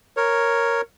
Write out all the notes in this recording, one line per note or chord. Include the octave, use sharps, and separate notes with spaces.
A#4 C#5